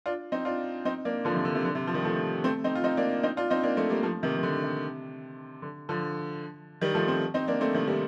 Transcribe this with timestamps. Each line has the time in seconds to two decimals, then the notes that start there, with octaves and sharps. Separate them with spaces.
0.06 D4 F4
0.32 C4 D#4
0.45 D4 F4
0.85 C4 D#4
1.05 A#3 D4
1.25 D3 F3
1.35 C3 D#3
1.45 D3
1.55 C3
1.65 D3
1.75 C3
1.87 F3
1.94 D#3 G3
2.05 F3 A3
2.44 A3 C4
2.64 C4 D#4
2.75 F4
2.84 C4 D#4
2.97 A#3 D4
3.23 C4 D#4
3.37 D4 F4
3.50 C4 D#4
3.63 A#3 D4
3.77 A3 C4
3.90 G3 A#3
4.03 F3 A3
4.23 C3 D#3
4.37 C3
4.43 D3
4.63 C3
5.62 D3
5.89 D3 F3
6.81 D#3 G3
6.95 F3 A3
7.08 A3 C4
7.34 C4 D#4
7.48 A#3 D4
7.61 A3 C4
7.74 C3 D#3
7.87 D#3 G3